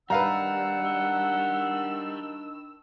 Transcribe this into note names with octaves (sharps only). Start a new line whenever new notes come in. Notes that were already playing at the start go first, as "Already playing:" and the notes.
D#3 G3 D4 B4 F5 F#5 A#5 E6